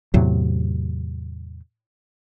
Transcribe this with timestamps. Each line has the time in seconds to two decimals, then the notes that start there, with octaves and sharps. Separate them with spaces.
0.14 E2 A2 C3 F#3